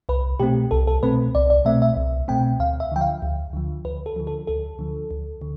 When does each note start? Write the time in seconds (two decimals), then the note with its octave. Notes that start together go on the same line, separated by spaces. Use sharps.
0.09 C2 B4
0.40 B2 A3 C4 G4
0.71 C2 A4
0.87 A4
1.03 B2 A3 C4 B4
1.35 C2 D5
1.50 D5
1.65 B2 A3 C4 E5
1.82 E5
1.96 C2
2.28 B2 A3 C4 G5
2.59 D2 F5
2.80 E5
2.92 D3 F3 G5
3.01 F5
3.22 D2
3.53 D3 F3
3.85 D2 B4
4.06 A4
4.16 D3 F3
4.27 A4
4.47 D2 A4
4.79 D3 F3
5.11 D2
5.42 D3